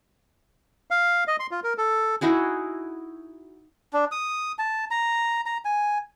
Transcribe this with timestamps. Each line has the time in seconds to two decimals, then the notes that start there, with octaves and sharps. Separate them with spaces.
0.91 F5
1.28 D#5
1.40 C6
1.51 F4
1.64 A#4
1.78 A4
2.21 D#4 E4 F#4 G#4
3.93 D4
4.12 D#6
4.59 A5
4.91 A#5
5.46 A#5
5.65 G#5